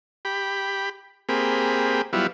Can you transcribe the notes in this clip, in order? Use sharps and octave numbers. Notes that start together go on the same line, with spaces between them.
G4 B5
A#3 C4 G4 G#4 B5
F#3 G3 B3 E4 F4